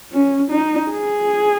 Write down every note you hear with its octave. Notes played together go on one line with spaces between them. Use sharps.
C#4
D#4
G#4